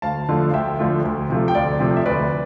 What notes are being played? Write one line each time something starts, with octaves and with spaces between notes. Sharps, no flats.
D2 F5 A5
D3 F3 A3
F5
D2 E5 G5
D3 F3 A3
D2
C3 F3 A3
G5
D2 D5 F5
C3 F3 A3
E5
D2 B4 D5